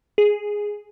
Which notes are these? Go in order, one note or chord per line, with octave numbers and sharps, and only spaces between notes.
G#4